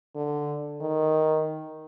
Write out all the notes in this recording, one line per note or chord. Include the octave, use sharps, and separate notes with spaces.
D3
D#3